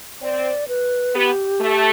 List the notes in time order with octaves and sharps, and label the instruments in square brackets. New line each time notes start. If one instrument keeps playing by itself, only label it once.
[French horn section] C4 [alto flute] D5
[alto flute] B4
[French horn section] B3 [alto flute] G4
[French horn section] A3